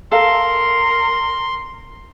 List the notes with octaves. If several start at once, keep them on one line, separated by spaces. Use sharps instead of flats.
A4 A#4 F5 C6